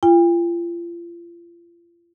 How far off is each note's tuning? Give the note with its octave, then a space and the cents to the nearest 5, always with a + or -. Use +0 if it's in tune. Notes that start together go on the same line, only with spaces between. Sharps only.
F4 -35 G5 +40